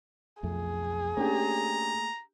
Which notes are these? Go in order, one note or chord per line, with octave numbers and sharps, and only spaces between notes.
B1 F2 A3 G#4
A3 A#3 C#4 D4 G4 A#5